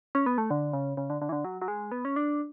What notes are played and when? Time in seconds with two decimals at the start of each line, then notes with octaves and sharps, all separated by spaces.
0.15 C#4
0.26 B3
0.38 A3
0.51 D3
0.73 C#3
0.97 C#3
1.10 D3
1.22 D3
1.29 E3
1.32 D3
1.45 F#3
1.62 F#3
1.68 G#3
1.92 B3
2.05 C#4
2.16 D4